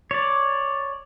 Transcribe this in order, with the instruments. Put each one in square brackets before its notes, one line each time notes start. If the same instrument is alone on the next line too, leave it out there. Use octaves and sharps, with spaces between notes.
[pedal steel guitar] C#5 D5